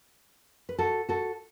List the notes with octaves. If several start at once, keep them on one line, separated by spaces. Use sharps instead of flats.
B4
F#4 A4
F#4 A4